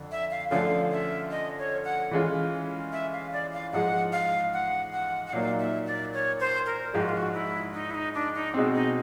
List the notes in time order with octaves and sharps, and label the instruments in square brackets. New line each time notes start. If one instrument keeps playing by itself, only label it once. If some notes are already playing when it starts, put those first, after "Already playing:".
Already playing: [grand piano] F2 D3
[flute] E5
F5
[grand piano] D3 F3 A3 C#4 [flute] F5
[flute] E5
D#5
C#5
F#5
[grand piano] E3 G#3 C#4 F4
[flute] E5
F5
D5
F5
[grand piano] G#2 F3 G#3 [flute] F#5
[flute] F5
F#5
F#5
F#5
[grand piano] A#2 F#3 A#3 D#4 [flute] F5
[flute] E5
D5
C#5
C5
A#4
[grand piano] G#2 F3 G#3 [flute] G4
[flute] F#4
F4
F#4
E4
D#4
E4
D#4
D4
D#4
[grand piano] B2 G#3 C4
[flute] D#4